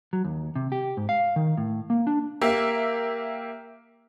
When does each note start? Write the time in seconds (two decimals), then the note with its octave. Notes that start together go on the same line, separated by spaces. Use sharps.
0.13 F#3
0.24 D#2
0.56 C3
0.72 G4
0.97 G#2
1.09 F5
1.36 D#3
1.57 A2
1.90 A#3
2.07 D4
2.41 A#3 G4 E5